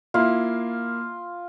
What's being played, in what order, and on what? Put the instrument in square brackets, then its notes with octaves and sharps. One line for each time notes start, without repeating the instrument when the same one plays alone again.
[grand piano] A#3 E4 [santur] F4